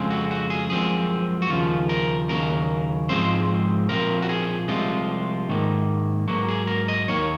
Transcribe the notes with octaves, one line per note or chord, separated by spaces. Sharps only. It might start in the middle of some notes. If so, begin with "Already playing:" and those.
Already playing: F2 C#3 G#3 C4
F#4
F#4
G#4
F#2 F3 G#3 C4 G#4
F#4
D#2 C#3 F3 F4
A#4
D#2 C#3 F#3 A#4
G#2 F3 G#3 C4 C5
A#2 F3 C4 A#4
F#4
G#4
C2 C3 F3 G#3 F4
G#2 D#3 A#3
G#2 F#3 A#3 F#4
G#4
A#4
D#5
D#2 D#3 A#3 C#5